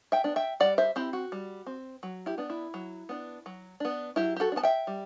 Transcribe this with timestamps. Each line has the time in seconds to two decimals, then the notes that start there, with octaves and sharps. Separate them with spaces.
0.12 E5 G5
0.24 B3 D4
0.36 E5 G5
0.60 G3 D5 F#5
0.78 C5 E5
0.96 C4 E4 G4
1.13 F#4
1.32 G3
1.67 C4
2.03 F#3
2.26 E4 G4
2.38 B3 D4
2.50 E4
2.74 F#3
3.09 B3 D4
3.46 F#3
3.80 B3 D4
4.16 F#3 E4 G4
4.36 G4
4.40 F#4 A4
4.52 D4
4.56 B3 A5
4.63 E5 G5
4.87 G3